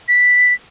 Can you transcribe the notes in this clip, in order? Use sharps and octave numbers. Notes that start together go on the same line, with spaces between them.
B6